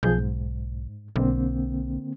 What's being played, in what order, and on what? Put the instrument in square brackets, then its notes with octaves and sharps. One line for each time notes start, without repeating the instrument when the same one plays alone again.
[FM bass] B1 [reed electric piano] F3 G#4 G6
[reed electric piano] G#2
[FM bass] B1 [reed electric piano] D3 A#3 C4